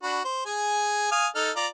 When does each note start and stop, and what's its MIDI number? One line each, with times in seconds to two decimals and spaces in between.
0.03 0.20 62
0.03 0.20 66
0.03 0.20 83
0.25 0.45 72
0.46 1.10 68
0.46 1.10 80
1.12 1.27 77
1.12 1.27 80
1.12 1.27 87
1.35 1.51 63
1.35 1.51 69
1.35 1.51 89
1.56 1.67 65
1.56 1.67 74
1.56 1.67 82